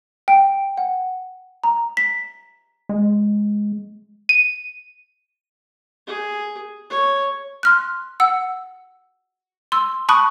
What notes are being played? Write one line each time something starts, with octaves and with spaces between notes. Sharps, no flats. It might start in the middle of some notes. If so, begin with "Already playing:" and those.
G5
F#5
A#5
B6
G#3
D#7
G#4
C#5
C6 F6 F#6
F#5 E6
C6 E6
A5 B5 C#6 D#6 F#6